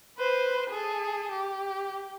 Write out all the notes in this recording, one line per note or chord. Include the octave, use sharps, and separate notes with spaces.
B4 C5
G#4 A4
G4